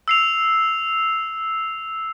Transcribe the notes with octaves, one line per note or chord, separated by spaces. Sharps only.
E6 C7 F7